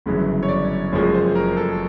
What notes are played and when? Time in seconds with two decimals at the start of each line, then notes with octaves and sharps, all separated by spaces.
0.06 G1 F#2 C#3 E3
0.43 C#5
0.48 D5
0.93 F#1 F#2 C#3 F3 G#3 C#5
1.14 C5
1.35 A#4
1.57 A4